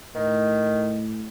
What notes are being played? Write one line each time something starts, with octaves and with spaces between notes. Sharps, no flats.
A2 D#3